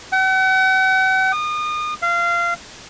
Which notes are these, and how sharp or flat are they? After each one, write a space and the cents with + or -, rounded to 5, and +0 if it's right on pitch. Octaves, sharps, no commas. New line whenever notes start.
F#5 +40
D#6 -35
F5 -20